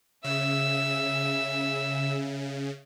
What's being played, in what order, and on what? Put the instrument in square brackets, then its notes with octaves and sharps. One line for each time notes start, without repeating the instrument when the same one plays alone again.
[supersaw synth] C#3 [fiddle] E5 E6